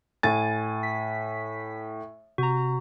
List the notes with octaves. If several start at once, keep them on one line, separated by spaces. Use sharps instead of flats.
A2 G#5 A6
B6
C3 F#4 A#5